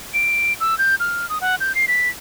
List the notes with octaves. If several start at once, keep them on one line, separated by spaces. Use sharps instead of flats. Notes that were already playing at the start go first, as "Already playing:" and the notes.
D7
E6
G6
F6
D#6
F#5
G6
C7
B6